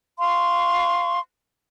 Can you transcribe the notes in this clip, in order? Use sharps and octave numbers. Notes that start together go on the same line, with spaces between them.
F5 C6 C#6